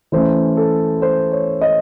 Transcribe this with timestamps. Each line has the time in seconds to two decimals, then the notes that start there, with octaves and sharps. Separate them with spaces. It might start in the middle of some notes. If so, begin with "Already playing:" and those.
0.12 E3 A3 C#4 C5
0.57 A4
1.02 C5
1.32 C#5
1.61 D#5